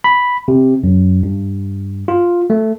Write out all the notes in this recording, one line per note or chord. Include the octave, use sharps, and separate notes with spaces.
B5
C3
F#2
G2
F4
A3